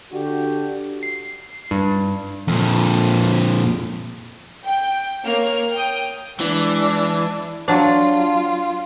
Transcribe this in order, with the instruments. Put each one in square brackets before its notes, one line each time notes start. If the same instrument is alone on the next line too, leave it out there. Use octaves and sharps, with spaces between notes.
[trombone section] D3 D4 F#4 G4
[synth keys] C7
G2
[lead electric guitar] F2 A#2
[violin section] G5
A#3 C#5 F6
G5 D#6
[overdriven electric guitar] E3 [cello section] G#3 D4
[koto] F#3 D4 [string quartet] F4